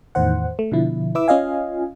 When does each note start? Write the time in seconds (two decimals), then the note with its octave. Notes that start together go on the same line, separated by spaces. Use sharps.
0.15 E2 A2 D#3 C5 F#5
0.59 A3
0.72 B2 D3 F3 E4
1.15 E4 B4 E5 D6 E6
1.28 C#4 F4 D#5 F5 G#5